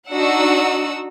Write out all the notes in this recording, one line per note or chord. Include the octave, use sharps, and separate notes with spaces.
D4 D#4 F#4 F#5 E6